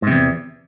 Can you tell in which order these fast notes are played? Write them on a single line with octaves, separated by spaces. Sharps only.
G#2 C3 E2